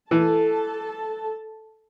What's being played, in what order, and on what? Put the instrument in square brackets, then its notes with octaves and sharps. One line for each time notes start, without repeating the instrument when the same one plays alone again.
[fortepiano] E3 [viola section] A4 A5